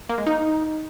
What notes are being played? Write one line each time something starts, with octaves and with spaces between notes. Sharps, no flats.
A#3
G#3
D#4